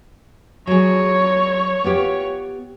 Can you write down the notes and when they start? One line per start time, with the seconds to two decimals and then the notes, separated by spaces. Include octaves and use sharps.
0.67 F#3 G#4 C#5
1.84 B3 F4 G4